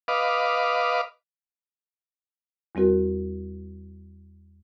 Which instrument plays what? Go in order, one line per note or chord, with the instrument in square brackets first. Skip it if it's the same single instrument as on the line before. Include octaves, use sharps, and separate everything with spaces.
[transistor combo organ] B4 D#5 F5 D6
[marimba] E2 G3 C4 F#4 A#4